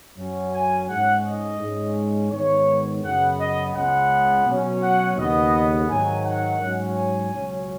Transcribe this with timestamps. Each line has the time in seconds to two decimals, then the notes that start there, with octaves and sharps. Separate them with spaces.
0.17 F#2 F#3 C#4
0.53 G#5
0.88 G#2 G#3 C#4 F#5
1.25 D#5
1.60 G#2 G#3 C#4
2.32 G#2 D#3 G#3 B3 C#5
3.03 F#2 C#3 B3 F#5
3.38 D#5
3.74 C#2 C#3 G#3 B3 F#5
4.46 B2 F#3 C#4
4.81 F#5
5.17 D#2 C#3 B3 D#5
5.89 G#2 D#3 F#3 G#5
6.25 F#5
6.60 G#2 F#3 C#4
6.96 G#5
7.32 C#2 B2 F#3 C#4